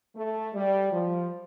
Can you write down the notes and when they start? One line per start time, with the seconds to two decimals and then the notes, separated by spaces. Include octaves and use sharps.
0.16 A3
0.55 G3
0.93 F3